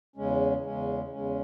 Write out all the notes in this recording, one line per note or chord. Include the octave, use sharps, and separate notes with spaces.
E2 C#3 G#3 C#4
E2 C#3 G#3 C#4
E2 C#3 G#3 C#4